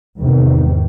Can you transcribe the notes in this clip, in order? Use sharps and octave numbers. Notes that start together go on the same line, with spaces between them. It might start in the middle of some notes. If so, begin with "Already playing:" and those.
E2 G#2 C3 D#3